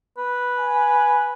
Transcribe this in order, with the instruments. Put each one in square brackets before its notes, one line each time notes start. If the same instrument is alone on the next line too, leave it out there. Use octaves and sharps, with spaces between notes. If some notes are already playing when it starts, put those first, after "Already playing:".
[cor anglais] B4
[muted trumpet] G#5